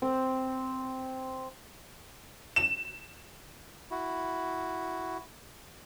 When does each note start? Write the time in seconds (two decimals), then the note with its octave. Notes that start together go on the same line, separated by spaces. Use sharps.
0.02 C4
2.56 E7
3.91 E4 F#4